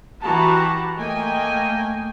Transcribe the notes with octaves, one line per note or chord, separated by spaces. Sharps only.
E3 F#4 G4 F#5 A5 A#5
A3 A#3 D#5 G5 G#5